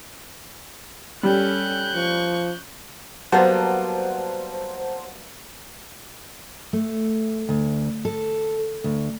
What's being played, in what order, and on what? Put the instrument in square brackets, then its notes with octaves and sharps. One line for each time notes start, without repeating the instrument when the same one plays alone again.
[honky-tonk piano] G3 [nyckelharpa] C#4 A4 [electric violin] F#6 G6
[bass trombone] F3 [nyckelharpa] C#6
[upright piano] F#3 [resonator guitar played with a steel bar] G3 A#3 B3 [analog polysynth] C5 [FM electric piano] F#5 A5
[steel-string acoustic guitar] A3
D2
A4
D2